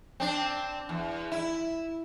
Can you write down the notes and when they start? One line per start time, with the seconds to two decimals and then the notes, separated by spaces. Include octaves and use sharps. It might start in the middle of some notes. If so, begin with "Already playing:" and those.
0.20 C4 D4
0.89 E2
1.32 E4